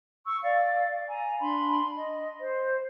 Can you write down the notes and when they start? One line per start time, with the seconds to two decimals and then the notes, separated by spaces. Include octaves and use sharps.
0.25 C#6 E6
0.42 D5 F5
1.07 G#5 A#5
1.38 D4 B5 C6
1.96 D#5
2.40 C5